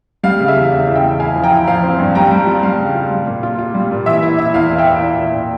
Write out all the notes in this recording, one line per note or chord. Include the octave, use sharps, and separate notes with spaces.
G3 F5
C#3
E5
E2
E2
C#3
E5 G5
E2
E4 F5 G#5
F3
G5 A#5
E4
F3 F5
C4
G2
G3 G5 A#5
G3
F4
G3 F5
C#3
F4
G3
A#2
F4
F4
G3
A#2
E3 E5
E4
E4 E5
E2 F5
E3
E5 G5
E4
A#2
A#2
A#2